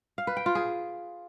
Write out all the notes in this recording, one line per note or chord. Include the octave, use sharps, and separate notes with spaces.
F5
B4
G5
F4
G#4